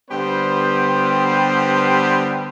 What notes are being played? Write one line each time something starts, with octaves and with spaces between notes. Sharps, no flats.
D3 G3 B3 G4 B4 C5